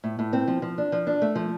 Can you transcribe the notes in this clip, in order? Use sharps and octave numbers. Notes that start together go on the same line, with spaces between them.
A2
A2
C4
F3
F3
D4
F3
D4
A3
F3